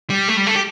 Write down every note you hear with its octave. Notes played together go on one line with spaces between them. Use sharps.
G3
A3
G3
A3
A4
G4